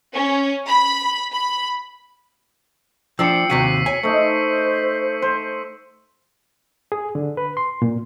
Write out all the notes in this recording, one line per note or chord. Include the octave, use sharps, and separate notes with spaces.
C#4
B5
B5
F3 D4 G5 E6 C7 C#7
D#2 C3 F#4 B6 D#7
C#5 G#5
A3 D#4 C5
C5
G#4
D3
B4
C6
A#2